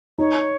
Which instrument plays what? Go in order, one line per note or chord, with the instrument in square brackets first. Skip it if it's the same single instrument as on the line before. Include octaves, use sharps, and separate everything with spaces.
[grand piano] D#4 [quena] C#5